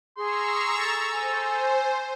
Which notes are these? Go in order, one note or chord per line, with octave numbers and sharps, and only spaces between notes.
G#4 A#5 C6 C#6 E6
A4
C5 G#5